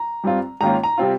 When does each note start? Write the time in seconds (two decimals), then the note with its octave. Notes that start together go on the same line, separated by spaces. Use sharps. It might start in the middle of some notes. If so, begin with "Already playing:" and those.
Already playing: A#5
0.24 G2 G3 C4 F4
0.61 G#2 D#3 A#3 C#4 F4 A#5
0.84 A#5
0.98 C3 G3 C4 F4